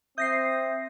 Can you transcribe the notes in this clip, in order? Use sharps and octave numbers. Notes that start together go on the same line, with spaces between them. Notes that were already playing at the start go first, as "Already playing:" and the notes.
C4 E5 D#6 G6 A#6 C7